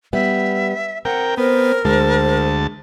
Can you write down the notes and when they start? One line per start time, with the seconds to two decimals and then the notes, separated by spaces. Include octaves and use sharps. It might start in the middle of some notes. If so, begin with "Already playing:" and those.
0.13 G3 B3 E5
1.05 C4 A#4 F#5 G5
1.38 B3 A#4 C5
1.85 D2 G#3 C5 A5